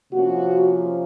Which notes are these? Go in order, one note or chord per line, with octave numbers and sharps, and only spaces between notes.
C3 F3 A#3 C#4 F#4